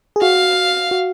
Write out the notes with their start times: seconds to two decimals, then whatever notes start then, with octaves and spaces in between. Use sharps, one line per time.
0.16 G#4
0.22 F#4 F5
0.91 F#4